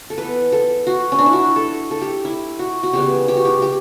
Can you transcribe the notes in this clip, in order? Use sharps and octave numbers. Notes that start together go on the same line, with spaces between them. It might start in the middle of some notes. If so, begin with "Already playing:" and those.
A4
E3 B3 B4
A4
F#4
C#4
D4
E4
F#4
A4
A4
G4
E4
F#4
F#4
C#3 E3 G3 B3 G4
G4
F#4
G4
G4